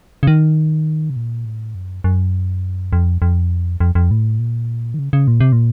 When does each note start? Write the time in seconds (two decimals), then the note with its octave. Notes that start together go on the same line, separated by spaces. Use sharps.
0.23 C#3
0.27 D#3
1.10 C3
1.16 A#2
1.45 A2
1.75 F#2
2.04 F#2
2.93 F2
3.22 F2
3.80 F2
3.95 F2
4.11 A2
4.39 A#2
4.94 D#3
4.99 C#3
5.13 C#3
5.28 A#2
5.40 C3
5.52 A#2